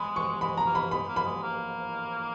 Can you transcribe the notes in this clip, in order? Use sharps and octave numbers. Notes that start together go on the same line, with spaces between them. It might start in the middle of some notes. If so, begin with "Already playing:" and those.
Already playing: G#3 B5
C#6
G#3 B5
A#5
A#3
B5
G#3 B5
A#3
B5
G#3
A#3